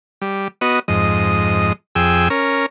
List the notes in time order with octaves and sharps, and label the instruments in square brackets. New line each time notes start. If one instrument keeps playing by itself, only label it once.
[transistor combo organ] G3
B3 F#4 D#5
F2 G#2 D#5
F2 G#4 G5 E6
C#4 A#4